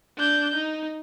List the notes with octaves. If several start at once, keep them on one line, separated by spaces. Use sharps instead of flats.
D4 G6
D#4